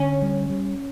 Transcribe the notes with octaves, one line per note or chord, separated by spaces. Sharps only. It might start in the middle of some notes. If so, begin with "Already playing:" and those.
Already playing: D3 C#4
G3
G3